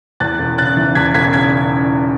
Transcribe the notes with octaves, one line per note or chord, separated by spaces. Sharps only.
E2 F#6 A6
E1
C#3 F#6 A6
E3
E2 G#6 B6
E1 G#6 B6
C#3 G#6 B6